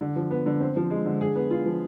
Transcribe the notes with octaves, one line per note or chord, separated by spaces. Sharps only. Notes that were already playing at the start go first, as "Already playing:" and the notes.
D3
F3
B3
D3
C4
F3
G#3
D3
G#4
B3
F4
F3